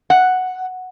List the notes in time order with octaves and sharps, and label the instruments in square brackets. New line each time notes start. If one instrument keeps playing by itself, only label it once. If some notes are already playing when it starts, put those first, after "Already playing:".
[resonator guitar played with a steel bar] F#5